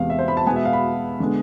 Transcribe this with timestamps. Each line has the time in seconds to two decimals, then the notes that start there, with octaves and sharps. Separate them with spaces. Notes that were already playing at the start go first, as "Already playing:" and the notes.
Already playing: E2 C3 G#3 B3 F5
0.10 E5
0.18 C5
0.28 B5
0.37 A5
0.47 B2 G#3 B3 G#5
0.56 E5
0.65 F5
0.73 B5
1.20 D3 G#3 B3